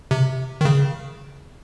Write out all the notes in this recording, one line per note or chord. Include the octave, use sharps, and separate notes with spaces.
C3
D#3
C#3